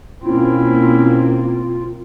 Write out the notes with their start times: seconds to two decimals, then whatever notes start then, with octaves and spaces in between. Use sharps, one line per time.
0.24 B2 A#3 C4 C#4 E4 F4